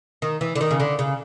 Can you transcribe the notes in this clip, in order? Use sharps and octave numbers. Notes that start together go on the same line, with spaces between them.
D#3
E3
D3
D#3
C#3
D3
C#3